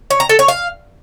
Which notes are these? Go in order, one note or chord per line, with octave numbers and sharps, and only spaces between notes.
C#5
A#5
A4
C#5
F5